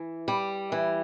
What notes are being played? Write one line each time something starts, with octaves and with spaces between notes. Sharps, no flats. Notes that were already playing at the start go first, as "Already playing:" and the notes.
Already playing: E3
G3
E3